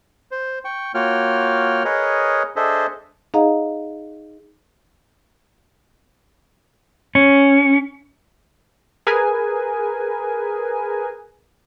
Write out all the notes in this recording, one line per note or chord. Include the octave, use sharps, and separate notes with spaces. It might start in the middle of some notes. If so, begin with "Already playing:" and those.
C5
G5 C#6
A#3 F4 F#4 C#5 G5 F6
G#4 A#4 B4 C#5 D#5
D4 G#4 A4 C5 D#5 E5
D#4 G#4 D#5 F5 F#5 A#5
C#4
G#4 A#4 B4 G#5